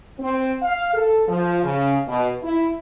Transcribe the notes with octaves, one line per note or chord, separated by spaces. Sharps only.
C4
F5
A4
F3
C#3
B2
E4